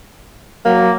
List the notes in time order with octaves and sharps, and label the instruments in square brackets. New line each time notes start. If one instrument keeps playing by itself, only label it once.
[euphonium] F#3 [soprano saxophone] A#3